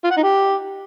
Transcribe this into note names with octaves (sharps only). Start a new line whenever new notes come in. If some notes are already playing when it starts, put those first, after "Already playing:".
F4
F#5
D#4
G4